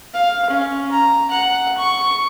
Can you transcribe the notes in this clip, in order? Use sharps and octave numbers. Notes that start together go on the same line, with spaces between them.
F5
C#4
A#5
F#5
C#6